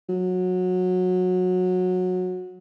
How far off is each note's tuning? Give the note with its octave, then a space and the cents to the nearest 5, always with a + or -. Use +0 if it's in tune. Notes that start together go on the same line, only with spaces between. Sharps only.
F#3 -20